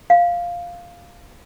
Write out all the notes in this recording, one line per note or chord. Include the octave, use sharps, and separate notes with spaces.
F5